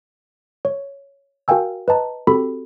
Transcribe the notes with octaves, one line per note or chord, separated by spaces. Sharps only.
C#5
F#4 A#4 F5 G5 G#5 E6
B4 D#5 A5 A#5
C4 F#4 G4 A4 B5